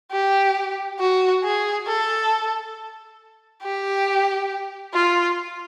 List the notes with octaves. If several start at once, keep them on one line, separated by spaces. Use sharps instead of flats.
G4
F#4
G#4
A4
G4
F4